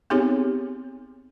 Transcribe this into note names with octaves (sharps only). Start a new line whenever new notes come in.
B3 C4 D#4 G4 G#4 C#5